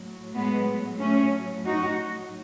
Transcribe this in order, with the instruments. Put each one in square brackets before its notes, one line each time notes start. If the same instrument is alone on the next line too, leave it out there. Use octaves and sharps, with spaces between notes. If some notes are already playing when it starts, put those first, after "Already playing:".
Already playing: [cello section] A2 F#3
G#3 B3
A3 C#4
D#4 F#4